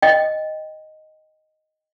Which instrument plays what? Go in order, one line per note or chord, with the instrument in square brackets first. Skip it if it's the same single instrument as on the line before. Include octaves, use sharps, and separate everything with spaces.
[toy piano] D#5 G5